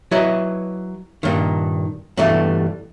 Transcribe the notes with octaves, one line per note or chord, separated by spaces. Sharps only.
F#3 E4 B4 D#5
G2 A#2 D#3
G2 B2 E3 G3 A3